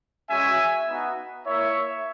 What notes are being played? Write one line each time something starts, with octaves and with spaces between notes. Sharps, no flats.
G#3 C#4 F#4 E5 G#5
B3 D#4 F#4
A#3 E4 C#5 E5